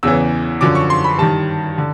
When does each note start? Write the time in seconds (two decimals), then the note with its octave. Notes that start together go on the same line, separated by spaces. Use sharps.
0.03 E2 C#3 E3 E6
0.61 F#2 D3 F3 D6
0.75 C#6
0.90 C6
1.04 B5
1.19 G2 D#3 A5
1.78 D3